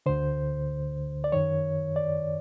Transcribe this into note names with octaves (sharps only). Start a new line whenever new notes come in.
D2 D3 C5
D5
F#2 D#3 C#5
D5